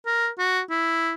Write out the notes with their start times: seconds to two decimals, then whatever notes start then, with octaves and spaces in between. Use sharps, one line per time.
0.06 A#4
0.38 F#4
0.70 E4